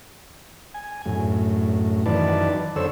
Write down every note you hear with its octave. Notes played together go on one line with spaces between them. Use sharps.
G#5
F#2 A2
F#2 D#3 E3 B4 D5 A5
F#2 D3 A4 C5 C#5 E6